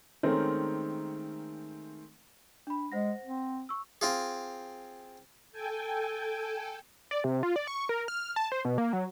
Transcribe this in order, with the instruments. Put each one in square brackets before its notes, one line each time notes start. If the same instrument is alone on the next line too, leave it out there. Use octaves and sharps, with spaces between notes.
[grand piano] D#3 G#3 A3 C4 C#4 A#4
[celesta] D4 B5
[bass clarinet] G#3 [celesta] C5 F#5 A#6
[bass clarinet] C4
[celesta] C#6 E6
[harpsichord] C4 F4 G#4
[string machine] A4 G5 G#5
[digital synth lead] D5
C3
F4
D5
C#6
A#4
F6
A5
C5
B2
A#3
F#3